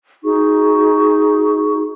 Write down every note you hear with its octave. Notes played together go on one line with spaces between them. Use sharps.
D#4 F#4 G#4 C#6